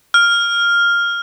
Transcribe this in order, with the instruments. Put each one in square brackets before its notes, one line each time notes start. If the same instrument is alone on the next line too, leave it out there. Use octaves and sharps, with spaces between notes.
[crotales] F6